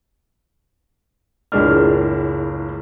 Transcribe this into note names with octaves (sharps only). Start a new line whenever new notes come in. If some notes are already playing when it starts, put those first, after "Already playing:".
F#1 C#2 A2 G#3 D4 F6